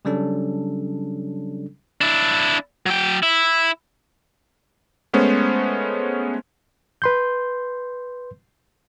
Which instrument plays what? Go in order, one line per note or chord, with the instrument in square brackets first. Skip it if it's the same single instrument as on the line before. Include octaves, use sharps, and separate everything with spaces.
[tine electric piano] C#3 F#3 G3 C#4 D4 A4
[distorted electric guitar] D4 E4
F#3 G5
E4
[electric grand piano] G#3 A3 B3 C#4 C5
[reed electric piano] B4 C6 G6